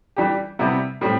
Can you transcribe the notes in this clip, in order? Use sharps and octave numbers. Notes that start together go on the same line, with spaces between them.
E3 G3 D4 G4
C3 G3 B3 E4
A2 G3 C4